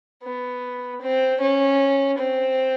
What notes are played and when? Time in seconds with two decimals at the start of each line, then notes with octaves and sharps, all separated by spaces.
0.23 B3
1.01 C4
1.40 C#4
2.18 C4